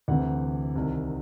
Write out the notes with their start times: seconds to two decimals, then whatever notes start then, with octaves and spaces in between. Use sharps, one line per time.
0.08 D2 C3 E3 F#5
0.76 C2 C3 D#3